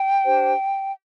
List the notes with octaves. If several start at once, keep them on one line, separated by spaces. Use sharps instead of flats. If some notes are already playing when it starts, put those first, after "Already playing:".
Already playing: G5
D4 G4 C5